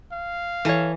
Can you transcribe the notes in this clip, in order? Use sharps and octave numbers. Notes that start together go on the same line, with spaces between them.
F5
E3 A4 C#5